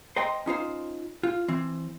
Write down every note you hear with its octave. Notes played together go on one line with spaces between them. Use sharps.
C5 D#5 G5 A#5 C6
C#4 D#4 F4 C5
F4
E3 C4